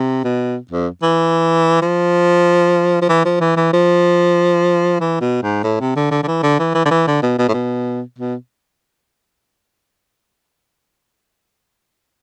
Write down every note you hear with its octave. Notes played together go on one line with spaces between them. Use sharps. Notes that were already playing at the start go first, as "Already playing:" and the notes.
Already playing: C3
B2
F2
E3
F3
F3
E3
F3
E3
E3
F3
E3
B2
G#2
A2
C3
D3
D3
D3
E3
D3
E3
E3
D3
E3
D3
B2
B2
A2
B2
B2